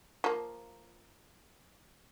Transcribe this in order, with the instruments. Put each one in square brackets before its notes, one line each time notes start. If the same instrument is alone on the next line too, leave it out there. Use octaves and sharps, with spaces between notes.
[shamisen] F3 A#3